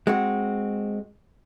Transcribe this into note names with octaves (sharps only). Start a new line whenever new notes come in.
G#3 C4 F#4